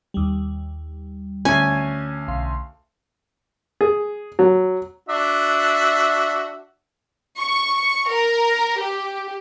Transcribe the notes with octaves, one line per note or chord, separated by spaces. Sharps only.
D#2 G3
D2 C#4 G#5
B1 F5 C6
G#4
F#3
D4 F#4 E5
C#6
A#4
G4